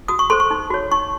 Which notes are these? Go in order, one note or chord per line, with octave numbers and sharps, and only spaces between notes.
F#4 D#6
C#6
A4 C5 C6
C#6
D#4
F#4 C#5
D#4 C#6